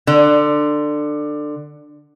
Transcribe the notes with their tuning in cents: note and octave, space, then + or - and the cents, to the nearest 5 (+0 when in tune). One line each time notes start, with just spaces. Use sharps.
D3 +20